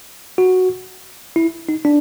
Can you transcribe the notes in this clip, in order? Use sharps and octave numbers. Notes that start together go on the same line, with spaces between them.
F#4
E4
D#4
D4